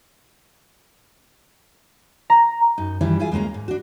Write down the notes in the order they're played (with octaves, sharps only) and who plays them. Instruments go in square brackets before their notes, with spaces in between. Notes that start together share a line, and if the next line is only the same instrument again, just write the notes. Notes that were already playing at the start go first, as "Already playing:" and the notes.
[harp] A#5
[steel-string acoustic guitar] F#2 D#4
F#2 D#3 E3 G3 E4
F#2 E4 F4 G#4 G#5
D2 G#3 A#3 C#4 A#5
G#2
D4 F#4